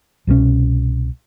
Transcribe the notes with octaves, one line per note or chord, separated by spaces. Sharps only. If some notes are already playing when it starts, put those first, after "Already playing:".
C2 B2 D3 C#4